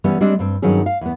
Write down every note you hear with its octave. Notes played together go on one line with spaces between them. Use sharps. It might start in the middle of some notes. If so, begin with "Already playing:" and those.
E3 G3 B3 C#4
G3 G#3 C4 D4
G2 C4
G2 D#3 F#3 C4 C#4 G#4
F5
E2 B3